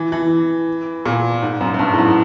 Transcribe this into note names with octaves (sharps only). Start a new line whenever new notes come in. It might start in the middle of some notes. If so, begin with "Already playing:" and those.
Already playing: E3
E3
A#2
G#2
F#2
F#2
G2
A2
G#2